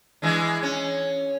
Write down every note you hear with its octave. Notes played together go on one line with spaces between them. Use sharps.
E3 G#3 D4
C#4